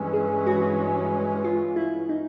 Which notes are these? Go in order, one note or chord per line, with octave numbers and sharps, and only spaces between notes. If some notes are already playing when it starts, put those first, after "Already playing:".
Already playing: G2 E3 G#3 C#4
G#4
F#4
F4
E4
D#4